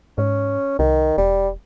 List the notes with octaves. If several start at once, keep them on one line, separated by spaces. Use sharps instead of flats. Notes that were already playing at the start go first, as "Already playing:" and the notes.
G#2 C#4
C2 D#3
E1 G3